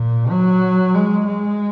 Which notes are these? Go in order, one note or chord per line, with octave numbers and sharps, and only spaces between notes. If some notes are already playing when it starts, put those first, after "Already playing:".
Already playing: A#2
F#3
G#3
G#3